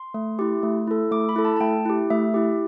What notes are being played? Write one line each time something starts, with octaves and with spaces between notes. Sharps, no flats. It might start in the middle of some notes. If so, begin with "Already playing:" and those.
Already playing: C6
A3
E4 G4
A3
E4 A4
A3 D6
B5
E4 A4
A5
A5
A3 G5
E4 G4
A3 E5
E4 G4